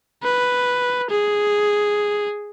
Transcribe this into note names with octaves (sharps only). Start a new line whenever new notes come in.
B4
G#4